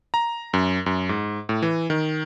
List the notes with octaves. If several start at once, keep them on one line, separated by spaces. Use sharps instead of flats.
A#5
F#2
F#2
G#2
A2
E3
D#3